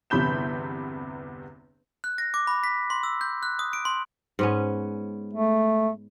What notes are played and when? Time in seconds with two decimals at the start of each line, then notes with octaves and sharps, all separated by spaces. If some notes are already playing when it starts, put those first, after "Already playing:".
0.10 G1 E2 C3 B5 G6 E7
2.04 F#6
2.18 A#6
2.34 D6
2.47 B5
2.63 B6
2.90 C6
3.03 E6
3.21 G6
3.43 F#6
3.59 D#6
3.73 D7
3.85 C6
4.39 G#2 B3 C#4
5.34 A3